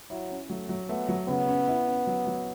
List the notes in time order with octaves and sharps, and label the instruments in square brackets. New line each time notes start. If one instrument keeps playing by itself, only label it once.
[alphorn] F#3 [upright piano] E4
[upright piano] C#4
[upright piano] F#3 [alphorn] A3
[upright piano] F#3
[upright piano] A3 [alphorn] B3
[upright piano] F#3
[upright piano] C#3 [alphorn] B3
[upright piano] C#4
E4
C#4
F#3
F#3